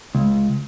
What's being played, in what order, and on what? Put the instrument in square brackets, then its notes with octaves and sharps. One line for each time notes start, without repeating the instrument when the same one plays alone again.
[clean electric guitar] C#2